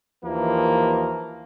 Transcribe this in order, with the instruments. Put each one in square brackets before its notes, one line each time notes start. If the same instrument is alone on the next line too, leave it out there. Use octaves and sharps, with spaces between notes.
[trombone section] D#2 E3 F3 A#3